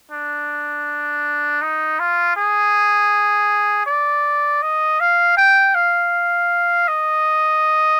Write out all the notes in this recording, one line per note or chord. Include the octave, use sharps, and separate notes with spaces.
D4
D#4
F4
G#4
D5
D#5
F5
G5
F5
D#5